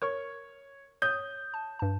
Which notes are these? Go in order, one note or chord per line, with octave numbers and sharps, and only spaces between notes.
A#4 C#5 C#6
C#5 D#6 G6
A5
G2 A5